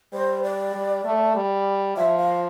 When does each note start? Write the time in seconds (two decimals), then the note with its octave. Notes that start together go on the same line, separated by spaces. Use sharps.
0.13 G3 C5
0.44 D5
0.74 G3
1.05 A3
1.36 G3
1.97 F3 E5
2.18 F5